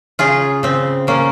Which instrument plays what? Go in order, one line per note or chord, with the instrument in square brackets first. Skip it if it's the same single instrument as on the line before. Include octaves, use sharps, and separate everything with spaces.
[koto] C#3 F4 G#4
C#3 C4
C#3 A#3 C#4